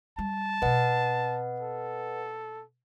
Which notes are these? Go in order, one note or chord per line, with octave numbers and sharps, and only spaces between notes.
G3 A5
B2 C4 B4 D#5 F#5
A4